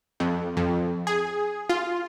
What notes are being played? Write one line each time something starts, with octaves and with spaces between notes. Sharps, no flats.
F2
F2
G#4
F4